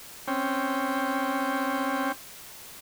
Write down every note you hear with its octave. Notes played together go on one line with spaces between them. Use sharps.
C4 C#4 G5